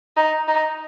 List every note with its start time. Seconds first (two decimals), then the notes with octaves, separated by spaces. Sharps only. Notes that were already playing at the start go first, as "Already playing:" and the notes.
0.17 D#4
0.48 D#4